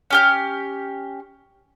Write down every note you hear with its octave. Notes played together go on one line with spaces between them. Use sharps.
C#4 G4 F6